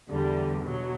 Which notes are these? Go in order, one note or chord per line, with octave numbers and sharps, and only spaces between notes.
E2 D3 G3
B2 F#3